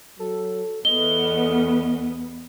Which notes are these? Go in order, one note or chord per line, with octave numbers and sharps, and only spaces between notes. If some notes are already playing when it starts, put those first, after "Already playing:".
F#3 A4
E2 B3 A4 D#5 G7